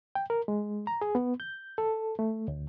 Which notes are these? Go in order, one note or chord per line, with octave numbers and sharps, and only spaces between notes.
G5
A#4
G#3
A#5
G#4
B3
G6
A4
A3
D2